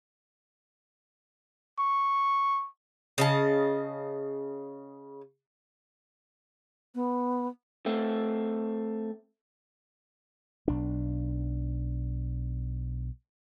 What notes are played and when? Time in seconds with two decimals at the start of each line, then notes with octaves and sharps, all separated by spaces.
1.79 C#6
3.18 C#3 D#5 A5
6.95 B3
7.86 A3 C4
10.68 B1 D4